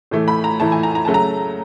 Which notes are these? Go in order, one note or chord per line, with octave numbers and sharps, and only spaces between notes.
A2 E3 A3
B5
A#5
A2 E3 A3 A5
G#5
A#5
A#5
C#3 F#3 A3 A5
A#5